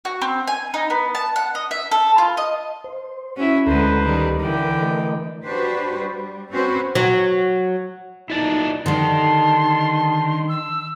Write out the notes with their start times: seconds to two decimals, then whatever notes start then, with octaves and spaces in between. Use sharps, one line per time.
0.05 F#4
0.22 C4
0.47 G#5
0.74 D#4
0.90 B3
1.15 A5
1.36 F#5
1.55 D#5
1.71 E5
1.91 A4
2.18 F4
2.37 D#5
2.84 C5
3.37 C#4 E4 F#4 E5
3.67 D2 D3 G#3 A4 B4 C5 A#5
4.04 D#3 G3
4.40 D3 E3 A#4 G5 D6
4.82 A3 A#4 D#5
5.43 D4 F#4 G4 B4 C5
5.96 G3
6.50 C4 C#4 F#4 B4 C5
6.95 F#3
8.30 B1 A#2 D#4 E4 D5 A5
8.86 D3 D#3 G3 A5 C6
10.49 E6